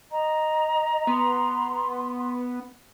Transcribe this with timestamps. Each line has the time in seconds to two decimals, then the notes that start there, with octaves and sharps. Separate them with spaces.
0.11 D#5 A#5
1.07 B3 C6